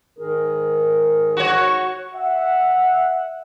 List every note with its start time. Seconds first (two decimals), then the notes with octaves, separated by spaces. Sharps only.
0.18 G#2 D#3 G#4 A#4
1.37 F#4 C#5
2.14 E5 F#5